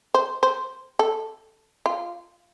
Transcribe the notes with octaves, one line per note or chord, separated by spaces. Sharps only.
C5
C5
A4
F4